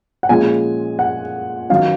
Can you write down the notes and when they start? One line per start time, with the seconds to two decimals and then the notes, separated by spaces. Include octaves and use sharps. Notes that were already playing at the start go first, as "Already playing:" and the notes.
0.23 F#5
0.29 A#2 F3 G#3 C#4 F4 G#5
0.99 F#5
1.70 D#3 F#3 C#4 F5